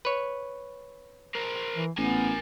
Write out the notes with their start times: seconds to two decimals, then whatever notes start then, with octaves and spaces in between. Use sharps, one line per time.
0.05 B4 C#5
1.35 A#4 C5
1.75 E3
1.98 A1 B3 A#4 G#5